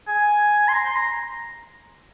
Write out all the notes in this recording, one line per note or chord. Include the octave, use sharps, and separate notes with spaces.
G#5
C6
A#5
C6
A#5